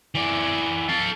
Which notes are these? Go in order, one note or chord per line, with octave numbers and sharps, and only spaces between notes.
E3 D5
A4 F5